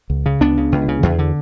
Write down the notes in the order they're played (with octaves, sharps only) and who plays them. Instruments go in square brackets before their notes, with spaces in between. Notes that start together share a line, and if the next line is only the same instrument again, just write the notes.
[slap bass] C#2
C#3
C#2 B3 D4
C#3
C#2
C#3
E2
D3